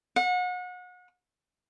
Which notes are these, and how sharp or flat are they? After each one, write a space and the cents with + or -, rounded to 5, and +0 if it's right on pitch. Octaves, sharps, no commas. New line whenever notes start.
F#5 -35